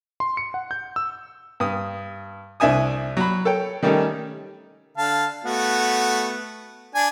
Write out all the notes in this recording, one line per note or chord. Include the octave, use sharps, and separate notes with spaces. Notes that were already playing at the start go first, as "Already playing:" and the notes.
C6
C#7
F#5
G6
E6
G2 D#6
C2 D4 E5 G#5 D#6
F#3 B5
A4 C#5 G5
D#3 G3 A3 C#4 D#4
D3 F5 A5
A3 B3 F#4
D4 G#5